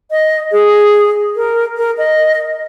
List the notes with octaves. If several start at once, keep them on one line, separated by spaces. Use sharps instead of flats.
D#5
G#4
A#4
A#4
D#5